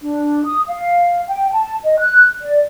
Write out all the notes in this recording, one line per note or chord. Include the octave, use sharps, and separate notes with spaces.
D4
D#6
F5
G5
A5
D#5
F#6
D5